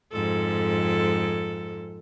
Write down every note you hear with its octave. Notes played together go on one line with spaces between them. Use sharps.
F2 G#2 A4